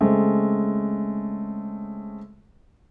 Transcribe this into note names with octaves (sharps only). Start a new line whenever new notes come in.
C#3 G#3 A3 C4